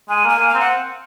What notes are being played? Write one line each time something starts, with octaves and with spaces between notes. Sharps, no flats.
G#3 G#5
A#3 G#5
A#3
F5
C4
F#5